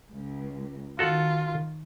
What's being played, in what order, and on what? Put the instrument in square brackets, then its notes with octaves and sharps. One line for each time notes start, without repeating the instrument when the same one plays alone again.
[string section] C#2
[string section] D#3 [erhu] F4 [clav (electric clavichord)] F#4 A4 F#5